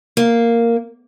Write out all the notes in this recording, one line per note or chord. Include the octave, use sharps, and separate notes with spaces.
A#3